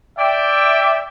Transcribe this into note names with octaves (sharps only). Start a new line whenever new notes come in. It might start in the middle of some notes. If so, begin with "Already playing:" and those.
D5 E5 G5